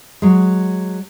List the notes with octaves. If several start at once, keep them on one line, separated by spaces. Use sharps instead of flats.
F#3 G#3